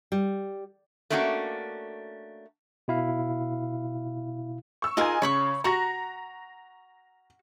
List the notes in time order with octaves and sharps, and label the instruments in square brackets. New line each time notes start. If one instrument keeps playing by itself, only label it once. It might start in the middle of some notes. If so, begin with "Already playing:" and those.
[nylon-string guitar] G3
[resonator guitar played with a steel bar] A3 A#3 C#4 D4 F4 F#4
[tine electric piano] B2 E4 F5
[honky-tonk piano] C#6 E6
[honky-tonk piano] D#4 G#5 [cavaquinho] F4 G#4 A#4
[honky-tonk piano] C#3 [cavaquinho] C#5 B5 C#6
[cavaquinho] F#4 C#6 [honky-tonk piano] A#5 A#6